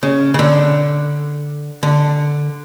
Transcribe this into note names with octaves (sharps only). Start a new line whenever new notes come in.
C#3
C#3
D3
D3